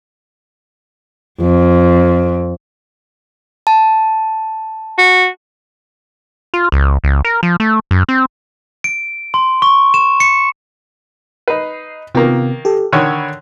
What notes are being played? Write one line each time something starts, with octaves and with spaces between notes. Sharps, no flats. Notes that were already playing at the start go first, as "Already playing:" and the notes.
F2
A5
F#4
F4
C#2
C#2
A#4
F3
A3
F#2
C4
D7
C6
C#6
E7
C#7
D#4 B4 C7
C3 D#3 A#3 B3 F4
G4 A4
D3 D#3 C#5 B5 E6